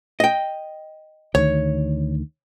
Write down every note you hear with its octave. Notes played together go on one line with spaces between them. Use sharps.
D#5 G5
D2 D#3 C#5